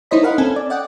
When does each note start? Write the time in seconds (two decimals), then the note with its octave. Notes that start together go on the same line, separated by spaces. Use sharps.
0.11 D#4 E4 C5 C#5 D#5 B5
0.23 A#4 D#5 F5 F#5 B5
0.38 C4 C#4 A4 G#5
0.56 D5
0.70 D5 D#5 F#5 G5